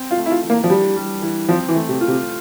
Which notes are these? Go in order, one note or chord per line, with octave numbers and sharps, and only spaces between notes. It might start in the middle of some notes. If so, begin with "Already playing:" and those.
Already playing: C4
F4
A3
E4
F4
E3
A#3
F3
G3 D4
G3
E3
F3 C4
E3
A3
C3
F4
C3